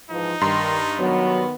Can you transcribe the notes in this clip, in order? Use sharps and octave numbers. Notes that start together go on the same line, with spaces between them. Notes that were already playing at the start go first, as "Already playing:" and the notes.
G#2 E3 F3 D#4
G2 D#3 A#5 C6
D#3 F#3 B3